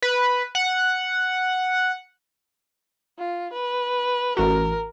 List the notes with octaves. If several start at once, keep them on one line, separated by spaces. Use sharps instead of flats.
B4
F#5
F4
B4
A1 F#4 A#4